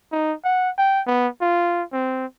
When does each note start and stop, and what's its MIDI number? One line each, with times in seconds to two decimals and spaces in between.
0.12 0.33 63
0.44 0.70 78
0.78 1.01 79
1.07 1.27 59
1.41 1.83 65
1.92 2.26 60